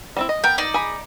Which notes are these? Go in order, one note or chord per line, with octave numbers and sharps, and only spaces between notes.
G3 C4 E4
D#5
B3 A#4 G5
D#4 D5
G#4 B5